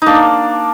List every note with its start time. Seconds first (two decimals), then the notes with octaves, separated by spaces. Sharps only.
0.02 A#3 D4 D#4